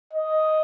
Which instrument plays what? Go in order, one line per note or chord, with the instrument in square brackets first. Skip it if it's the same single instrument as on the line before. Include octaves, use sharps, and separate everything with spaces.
[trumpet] D#5